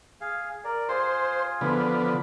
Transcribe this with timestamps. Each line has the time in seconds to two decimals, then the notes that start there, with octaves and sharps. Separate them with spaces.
0.21 G#4 F5
0.64 A#4 D5
0.89 F4 G#4 C5
1.61 D3 F3 B3